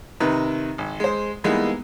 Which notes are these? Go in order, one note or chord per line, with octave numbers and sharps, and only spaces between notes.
C3 D#3 D#4 B4
G#1
G#3 C5
E3 G3 G#3 A#3 B3 D#4